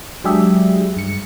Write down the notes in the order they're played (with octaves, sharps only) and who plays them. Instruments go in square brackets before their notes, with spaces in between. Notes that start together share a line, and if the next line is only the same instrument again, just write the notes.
[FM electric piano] F#3 G#3 D4 G4 G#4 E5
G2 C#7